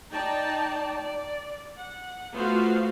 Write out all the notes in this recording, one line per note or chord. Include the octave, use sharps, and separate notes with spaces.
D#4 D5 G5 A5 A#5
D5
F#5
A3 B3 F4 F#4 C5 F5